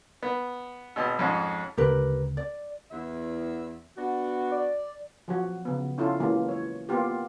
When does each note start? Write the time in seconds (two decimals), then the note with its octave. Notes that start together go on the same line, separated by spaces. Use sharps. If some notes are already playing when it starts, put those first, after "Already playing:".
0.23 B3
0.96 G#1 B2
1.19 F2 G#2 C#4
1.77 D2 C#3 G#3 G4 A#4 B4
2.37 D5
2.91 E2 E5
3.96 B3 D4 F#4
4.51 D5
5.28 F3 F#3 F#4
5.65 C#3 B3
5.98 C#4 E4 F4 A4
6.20 E3 F#3 G#3 A#3 C#4
6.48 C#5
6.89 A#3 B3 F4 G4